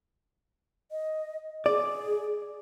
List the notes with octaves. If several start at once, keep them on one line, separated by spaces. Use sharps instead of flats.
D#5
G#4 D5